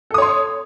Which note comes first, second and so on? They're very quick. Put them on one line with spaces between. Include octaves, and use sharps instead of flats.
A4 D#6 C#5 C6